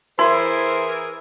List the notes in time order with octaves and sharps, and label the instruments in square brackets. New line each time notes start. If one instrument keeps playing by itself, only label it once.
[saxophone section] E3 G#4 A#4 [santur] E4 [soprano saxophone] C5 [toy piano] C6